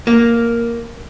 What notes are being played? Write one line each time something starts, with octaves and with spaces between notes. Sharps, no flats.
A#3